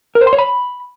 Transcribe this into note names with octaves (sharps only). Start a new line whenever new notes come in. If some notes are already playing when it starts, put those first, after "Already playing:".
A#4
C5
C6
C#5
B5